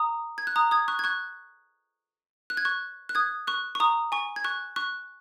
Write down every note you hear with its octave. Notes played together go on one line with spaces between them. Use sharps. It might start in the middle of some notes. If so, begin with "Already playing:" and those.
Already playing: A#5 D#6
G#6
F#6
A#5 D#6
D#6 G#6
C#6 F#6
G#6
C#6 F#6
F#6
G#6
C#6 F#6
F#6
D#6 G#6
C#6 F#6
C#6
A#5 D#6
G#5 C#6
G#6
C#6 F#6
C#6 F#6